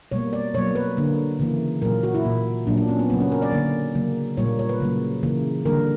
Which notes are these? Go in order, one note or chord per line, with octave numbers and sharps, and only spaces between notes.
B2 G3 A#3 C#5
D5
B2 F#3 A#3 C#5
B4
D3 A#3
C#3 E3 A#3
A#2 F#3 A#3 A#4
F#4
E4
A#2 A#3
A#2 F#3 A#3 D4
D4
C#4
B3
C#3 F#3 A#3 B3
C#4
A#4
D5
D3 A#3
C#3 F#3 A#3
A#2 G3 A#3 C#5
C#5
B4
C#3 F#3 A#3
C#3 E3 A#3
D3 G3 A#3 A#4